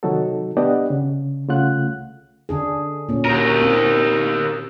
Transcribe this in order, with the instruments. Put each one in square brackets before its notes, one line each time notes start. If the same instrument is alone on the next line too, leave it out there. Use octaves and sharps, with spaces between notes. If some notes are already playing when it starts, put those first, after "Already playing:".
[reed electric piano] C3 D#3 F#3 D#4 F#4 A4
B3 D4 G4 D5 D#5 F#5
C#3
C2 C#3 A3 F4 F#5 F#6
[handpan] D3 D4 G#4
A#2 C#4
[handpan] F#4 [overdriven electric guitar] G4 A#4
[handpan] C4